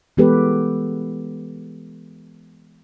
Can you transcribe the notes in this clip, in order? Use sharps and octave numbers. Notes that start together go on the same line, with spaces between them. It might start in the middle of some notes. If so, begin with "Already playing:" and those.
E3 G#3 B3 G4 A4 B4